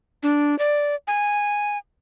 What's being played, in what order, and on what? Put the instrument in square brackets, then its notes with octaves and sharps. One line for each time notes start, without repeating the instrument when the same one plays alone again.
[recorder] D4
D5
G#5